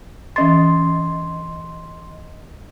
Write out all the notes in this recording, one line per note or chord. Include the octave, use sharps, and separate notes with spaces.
E3 C#4 D#5 C6 A6